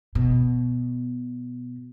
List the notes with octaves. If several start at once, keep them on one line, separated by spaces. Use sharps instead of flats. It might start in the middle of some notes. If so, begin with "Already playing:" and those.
B2